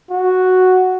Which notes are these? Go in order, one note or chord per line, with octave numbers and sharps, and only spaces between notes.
F#4